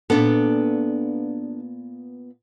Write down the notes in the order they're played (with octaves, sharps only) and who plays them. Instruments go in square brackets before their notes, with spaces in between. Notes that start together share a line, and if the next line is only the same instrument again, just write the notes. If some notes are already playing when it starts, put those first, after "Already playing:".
[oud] A#2 B3 [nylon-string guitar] D4 A4